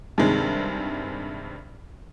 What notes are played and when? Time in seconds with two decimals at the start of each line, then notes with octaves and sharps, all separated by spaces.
0.18 G2 C3 D#3 G#3